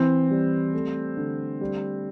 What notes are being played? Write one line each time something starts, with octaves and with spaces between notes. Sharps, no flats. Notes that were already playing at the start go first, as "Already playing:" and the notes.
Already playing: E3 C4
G3
A3
D3
G3